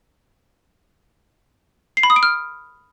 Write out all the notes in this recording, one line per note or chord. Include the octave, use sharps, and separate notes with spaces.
C7
B5
D#6
D7
F6